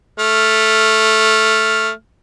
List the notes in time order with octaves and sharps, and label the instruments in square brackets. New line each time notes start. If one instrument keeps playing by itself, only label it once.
[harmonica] A3 F6